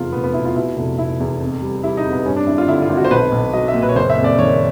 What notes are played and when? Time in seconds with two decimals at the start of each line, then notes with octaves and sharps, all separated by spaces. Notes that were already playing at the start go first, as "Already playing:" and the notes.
Already playing: F1 E2 F4
0.12 F1 B3
0.24 B3
0.34 B2 E4
0.45 F4
0.55 B2 E4
0.77 F1
0.98 F1 E4
1.20 E2
1.41 F2
1.62 G3
1.83 G3 E4
1.97 D#4
2.04 F2
2.12 B3
2.25 G2 C#4
2.36 D4
2.46 G#1 E4
2.58 F4
2.68 D3 E4
2.82 F4
2.90 G#1
2.97 F#4
3.05 C5
3.11 B1 B4
3.32 B1
3.53 F#3 D#5
3.68 E5
3.74 A#2
3.82 B4
3.89 C#5
3.95 F#1 C5
4.10 E5
4.17 F2
4.24 D5
4.39 D#3 C#5